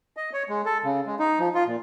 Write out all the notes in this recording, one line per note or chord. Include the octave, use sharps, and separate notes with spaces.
D#5
C#5
G#3
A4
C#3
G#3
D#4
F3
F4
A#2